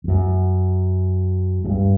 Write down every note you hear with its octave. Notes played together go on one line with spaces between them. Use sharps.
F2
F#2
F#2
G2